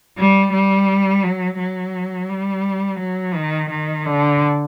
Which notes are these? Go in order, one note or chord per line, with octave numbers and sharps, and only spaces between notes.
G3
G3
F#3
F#3
G3
F#3
D#3
D#3
D3